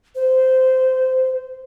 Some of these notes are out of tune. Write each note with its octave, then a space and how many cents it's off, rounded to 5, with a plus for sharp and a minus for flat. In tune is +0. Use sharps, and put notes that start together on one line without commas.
C5 -15